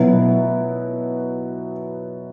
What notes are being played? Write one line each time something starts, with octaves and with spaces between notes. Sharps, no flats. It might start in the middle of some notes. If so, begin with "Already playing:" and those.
Already playing: B2 F#3 B3 E4